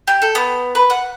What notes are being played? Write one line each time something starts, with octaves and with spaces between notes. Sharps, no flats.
G4
A4
B3
B4
F#5